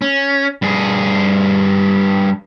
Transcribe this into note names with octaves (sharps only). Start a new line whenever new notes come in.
C#4
G2 G#4